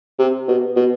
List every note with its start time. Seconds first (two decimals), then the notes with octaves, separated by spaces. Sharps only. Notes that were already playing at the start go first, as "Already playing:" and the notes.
0.19 C3
0.48 B2
0.76 B2